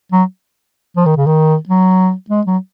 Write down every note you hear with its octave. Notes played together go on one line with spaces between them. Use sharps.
F#3
F3
D#3
C#3
D#3
F#3
G#3
F#3